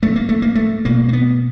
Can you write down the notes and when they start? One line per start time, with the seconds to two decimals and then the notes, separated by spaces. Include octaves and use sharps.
0.02 A2 A3
0.16 A#3
0.29 A3
0.42 A#3
0.55 A3
0.85 B2 A#3
1.08 A#3
1.13 B3